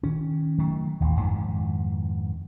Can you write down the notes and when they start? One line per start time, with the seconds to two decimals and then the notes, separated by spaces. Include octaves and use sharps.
0.03 D#3 C#4
0.58 D#3 F#3 A3
1.00 A1 D#2
1.20 F2 G#2 D#3 E3